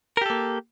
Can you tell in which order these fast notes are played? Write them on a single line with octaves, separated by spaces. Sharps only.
A#4 G4 A4 A#3